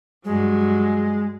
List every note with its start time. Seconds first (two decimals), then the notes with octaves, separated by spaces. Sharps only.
0.25 G2 F#3 G#3